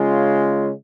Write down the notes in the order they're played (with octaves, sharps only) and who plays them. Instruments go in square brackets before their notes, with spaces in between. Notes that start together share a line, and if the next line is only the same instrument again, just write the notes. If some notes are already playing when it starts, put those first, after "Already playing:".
Already playing: [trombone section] C#3 G#3 C#4 F4